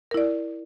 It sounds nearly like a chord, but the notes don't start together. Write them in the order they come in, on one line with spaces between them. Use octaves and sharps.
A#4 E4 D5